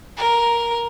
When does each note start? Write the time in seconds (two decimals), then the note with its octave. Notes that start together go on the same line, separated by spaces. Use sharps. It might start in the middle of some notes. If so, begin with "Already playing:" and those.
0.17 A#4